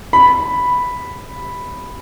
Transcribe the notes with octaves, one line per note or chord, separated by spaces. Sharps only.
B5